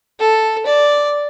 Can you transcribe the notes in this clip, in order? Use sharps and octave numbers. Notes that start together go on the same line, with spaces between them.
A4
D5